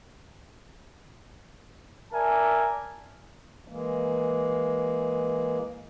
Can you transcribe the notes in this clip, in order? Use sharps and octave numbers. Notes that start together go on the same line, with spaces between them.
A#4 D5 E5 G#5 A5
E3 G#3 A#3